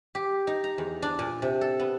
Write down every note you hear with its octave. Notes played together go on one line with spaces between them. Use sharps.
G4
D#4
A#5
E2
D4
A#2
C3
A4
B3